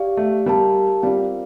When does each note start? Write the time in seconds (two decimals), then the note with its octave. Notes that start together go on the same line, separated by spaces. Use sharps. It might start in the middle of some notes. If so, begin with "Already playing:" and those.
Already playing: G4 D5 F5
0.17 A3
0.46 G3 G4 A#4 F5 A5
1.03 G3 C4 F4 A#4 D5 F5